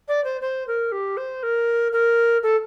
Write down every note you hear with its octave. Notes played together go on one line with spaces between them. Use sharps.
D5
C5
C5
A#4
G4
C5
A#4
A#4
A4